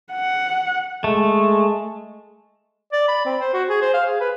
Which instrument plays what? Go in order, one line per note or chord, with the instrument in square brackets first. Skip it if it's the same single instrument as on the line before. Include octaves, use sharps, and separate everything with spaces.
[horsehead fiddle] F#5
[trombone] G#3 [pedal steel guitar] A3
[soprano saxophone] D5
B5
C4
C5
F#4
G#4
C5
F5
G#4
B4